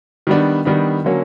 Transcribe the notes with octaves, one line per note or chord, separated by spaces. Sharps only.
D#3 G3 B3 D4
D#3 G3 B3 D4
D3 F#3 A#3 C#4